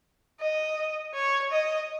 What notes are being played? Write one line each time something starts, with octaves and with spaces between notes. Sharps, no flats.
D#5
C#5
D#5